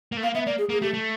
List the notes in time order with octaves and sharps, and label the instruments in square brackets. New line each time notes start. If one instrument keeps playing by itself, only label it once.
[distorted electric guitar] A#3
A3
[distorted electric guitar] A#3 [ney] F5
[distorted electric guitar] B3 [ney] E5
[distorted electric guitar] A#3 [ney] D5
[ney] G#4
[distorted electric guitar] A#3 [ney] G#4
[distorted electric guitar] A3 [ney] G4
[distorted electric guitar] A3